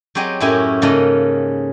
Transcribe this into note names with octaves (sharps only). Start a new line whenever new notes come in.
F#3 C4 G4 G#4 D#5
F#2 A2 C#4 E4 G4 G#5
G#2 C#3 A#3 A4 D#5